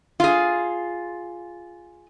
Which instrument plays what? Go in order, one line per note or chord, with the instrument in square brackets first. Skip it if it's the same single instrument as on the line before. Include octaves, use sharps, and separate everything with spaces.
[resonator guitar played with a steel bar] F4 G#4